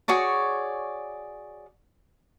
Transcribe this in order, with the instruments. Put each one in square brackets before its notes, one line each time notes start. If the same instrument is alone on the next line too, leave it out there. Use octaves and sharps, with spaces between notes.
[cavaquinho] F#4 G#4 C#5 D5